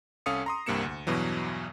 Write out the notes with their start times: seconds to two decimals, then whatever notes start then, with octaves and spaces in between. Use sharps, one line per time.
0.26 C2 C#4 A4 F5 D#6 C#7
0.46 A#5 C6 D#6
0.66 C2 G2 C3 A#3 C#7 E7
0.83 D2
1.07 E2 G2 B2 E3 F#3